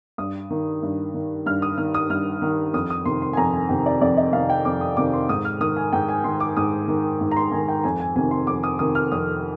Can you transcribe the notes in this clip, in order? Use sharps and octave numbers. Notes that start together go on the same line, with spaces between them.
G2 D#6
D#3
G2
D#3
G2 F6
D#6
D#3 F6
D#6
G2 F6
D#3
F2 D#6
D#6
C3 D#3 C6
C6
G#5
F2 A#5
G#5
C3 D#3 G5
D5
F2 D5
D#5
C3 D#3 F5
G5
F2 D6
D#6
C3 D#3 D6
C6
G#2 D#6
F6
D#3 D#6
G#5
G#2 G5
G#5
D#3 C6
D6
G#2 D#6
D#3
G#2
A#5
C6
D#3 G#5
G5
F2 G#5
G#5
C3 D#3 G#5
C6
F2 D6
D#6
C3 D#3 D#6
F6
F2 D#6